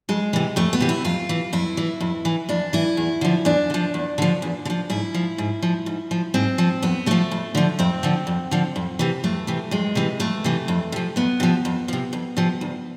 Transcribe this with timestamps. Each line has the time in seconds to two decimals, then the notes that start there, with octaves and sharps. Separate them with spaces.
0.09 F2 G#3
0.33 C3 E3
0.56 F2 A3
0.73 B3
0.80 C3 E3
0.89 E4
1.04 F2 F4
1.29 E3
1.53 F2 E4
1.77 E3
2.01 F2
2.25 E3
2.49 F2 D4
2.73 E3 E4
2.97 E2
3.21 D3 F3
3.45 E2 D4
3.70 D3
3.74 F3
3.94 E2
4.18 D3 F3
4.42 E2
4.65 D3
4.70 F3
4.90 G#2 E4
5.14 F3
5.38 G#2
5.62 F3
5.86 G#2
6.11 F3
6.34 G#2 C4
6.58 F3
6.83 F2 B3
7.06 D3 F3 A3
7.31 F2
7.55 D3 F3
7.79 F2 C4
8.03 D3 F3
8.27 F2
8.51 D3 F3
8.76 F2
8.99 C3 E3
9.24 F2 A3
9.47 C3 E3
9.71 F2 G#3
9.95 C3 E3
10.20 F2 A3
10.44 C3 E3
10.68 F2
10.92 C3 F3
11.16 F2 B3
11.40 C3 F3
11.65 F2
11.88 C3 F3
12.13 F2
12.37 C3 F3
12.61 D2